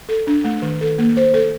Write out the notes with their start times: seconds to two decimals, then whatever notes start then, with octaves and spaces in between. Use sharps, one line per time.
0.09 A4
0.27 D4
0.44 A3
0.62 D#3
0.81 A4
0.98 A#3
1.17 C5
1.34 A4